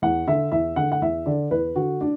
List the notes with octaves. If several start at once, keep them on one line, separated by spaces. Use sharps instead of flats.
E2 F#5
D3 E5
E2 E5
D3 F#5
F#5
E2 E5
D3 D5
E2 B4
D3 F#4
D4